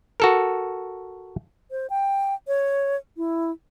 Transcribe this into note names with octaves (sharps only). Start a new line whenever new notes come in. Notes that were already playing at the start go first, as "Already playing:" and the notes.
F#4 A4 A#4
C5
G5
C#5
E4